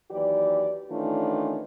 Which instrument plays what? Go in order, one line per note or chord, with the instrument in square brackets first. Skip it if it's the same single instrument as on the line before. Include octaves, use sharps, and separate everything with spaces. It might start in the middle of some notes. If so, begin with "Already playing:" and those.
[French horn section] D#2 E3 F#3 G4 D5
D#3 E3 A3 C#4 D4 F4